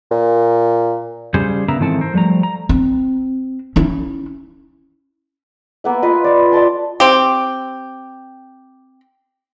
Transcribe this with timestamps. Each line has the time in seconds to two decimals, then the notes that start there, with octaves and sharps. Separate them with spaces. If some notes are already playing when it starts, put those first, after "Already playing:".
0.11 A#2
1.34 C#3 G3 G#4 C5
1.68 C#3 B3 A#4 E5 A#5
1.80 G#2 D#3 E3 C4 A4 A5
2.01 A#4 C5
2.14 F3 G3 A3 A#5
2.43 A#5
2.69 C4
3.76 C#4 E4
5.84 A#3 B3 E5
6.02 B3 F4 B4 D#5
6.24 D5 F5
6.52 D5 D#5 A5 C6
7.00 C4 G4